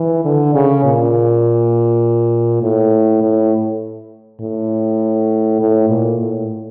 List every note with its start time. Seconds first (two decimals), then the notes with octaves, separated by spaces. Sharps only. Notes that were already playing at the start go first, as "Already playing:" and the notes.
Already playing: E3
0.24 D3
0.54 C#3
0.84 A#2
2.63 A2
3.22 A2
4.41 A2
5.61 A2
5.89 A#2
6.19 A2